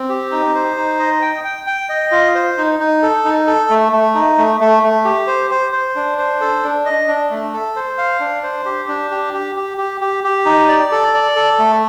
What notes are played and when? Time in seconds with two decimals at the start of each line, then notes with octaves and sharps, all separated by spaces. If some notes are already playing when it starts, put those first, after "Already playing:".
Already playing: C4
0.09 G4
0.31 D#4
0.55 C5
0.77 D#4
0.99 D#5
1.22 G5
1.44 G5
1.67 G5
1.89 D#5
2.11 F4
2.35 C5
2.57 D#4
2.79 D#4
3.02 A4
3.25 D#4
3.47 A4
3.70 A3
3.93 A3
4.14 D#4
4.38 A3
4.60 A3
4.83 A3
5.05 G4
5.27 C5
5.51 C5
5.73 C5
5.95 D4
6.18 C5
6.41 A4
6.63 D4
6.85 D#5
7.08 D4
7.30 A3
7.53 A4
7.76 C5
7.98 F5
8.20 D4
8.43 C5
8.65 G4
8.88 D4
9.11 G4
9.33 G4
9.56 G4
9.78 G4
10.01 G4
10.24 G4
10.45 D#4
10.68 D5
10.92 A4
11.14 D5
11.36 A4
11.59 A3